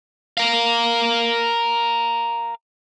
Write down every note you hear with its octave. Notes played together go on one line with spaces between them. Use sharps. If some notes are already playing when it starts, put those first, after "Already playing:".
A#4 F5